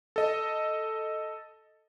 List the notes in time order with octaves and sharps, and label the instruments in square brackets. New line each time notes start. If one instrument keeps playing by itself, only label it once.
[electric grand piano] A4 D#5